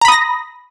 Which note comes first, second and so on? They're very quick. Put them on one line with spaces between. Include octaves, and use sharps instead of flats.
A#5 B5 D#6 A#6